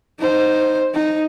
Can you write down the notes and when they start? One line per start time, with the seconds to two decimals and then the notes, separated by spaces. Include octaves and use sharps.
0.19 D#4 C5
0.94 D#4